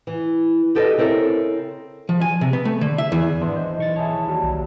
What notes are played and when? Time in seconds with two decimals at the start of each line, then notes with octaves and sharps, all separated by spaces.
0.07 E3
0.75 F#4 G4 A4 B4 D5 D#5
0.98 C#3 C4 E4 A4 A#4
2.09 F3
2.21 G#5
2.41 C3
2.53 B3
2.65 A3
2.81 D3
2.98 E5
3.12 E2
3.41 G#1 E3 B3 D4 C6
3.56 C5 D#5
3.78 B1 C#6 A6
3.96 E4 G#4 C#5 A5
4.27 D#2 F#3 G3
4.43 B1